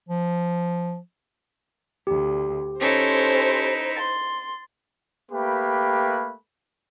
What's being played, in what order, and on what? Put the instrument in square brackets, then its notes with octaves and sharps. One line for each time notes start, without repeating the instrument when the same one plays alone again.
[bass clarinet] F3
[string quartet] D2 [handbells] G4
[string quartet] C#4 A4 [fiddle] D#4 E4 [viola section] C5
[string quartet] C6 [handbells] A6
[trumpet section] A3 A#3 G4 B4 B5